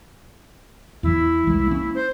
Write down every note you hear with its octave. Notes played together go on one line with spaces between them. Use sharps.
E2 E3 E4
C2 E3 G#3
A#3 C#4
C5